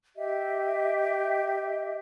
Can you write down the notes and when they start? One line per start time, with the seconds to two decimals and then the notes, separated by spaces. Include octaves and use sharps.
0.15 G4 D#5 E5